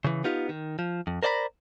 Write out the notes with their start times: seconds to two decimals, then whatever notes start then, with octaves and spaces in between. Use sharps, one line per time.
0.04 C#3 E3
0.24 B3 D#4 F4 G4
0.49 D#3
0.79 F3
1.07 F2
1.23 A#4 C5 D5 D#5 A#5 B5